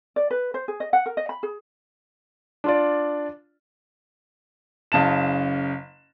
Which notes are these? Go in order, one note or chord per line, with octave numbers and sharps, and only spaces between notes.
D5
B4
C5
G#4
D#5
F#5
A#4
D#5
B5
G#4
D4 F4 D5
F#1 C#3 A5 E7